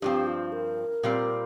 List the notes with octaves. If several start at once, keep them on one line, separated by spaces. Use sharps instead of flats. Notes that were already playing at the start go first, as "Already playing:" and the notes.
G2 F3 C4 G4
F4
A#4
A#2 G3 C4